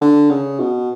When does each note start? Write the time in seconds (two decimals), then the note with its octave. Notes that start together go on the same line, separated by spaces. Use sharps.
0.01 D3
0.31 C#3
0.60 B2